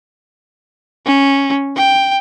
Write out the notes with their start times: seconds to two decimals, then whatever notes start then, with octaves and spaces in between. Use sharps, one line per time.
1.06 C#4
1.76 G5